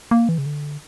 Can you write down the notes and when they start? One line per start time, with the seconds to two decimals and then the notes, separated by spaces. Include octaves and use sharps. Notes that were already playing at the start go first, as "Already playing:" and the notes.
0.11 A#3
0.29 E3
0.38 C#3
0.46 D3